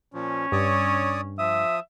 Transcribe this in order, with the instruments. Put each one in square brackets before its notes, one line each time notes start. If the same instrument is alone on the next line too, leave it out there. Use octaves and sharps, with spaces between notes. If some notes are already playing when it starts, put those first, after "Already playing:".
[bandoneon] A#2 F3 [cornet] C#4
[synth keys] G2 [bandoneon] C#5 D5 D#6
[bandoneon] F3 D#6 [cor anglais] E5